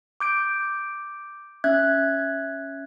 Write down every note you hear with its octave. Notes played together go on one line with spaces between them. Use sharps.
D6 G6 D7
C#4 E5 F#6 G#6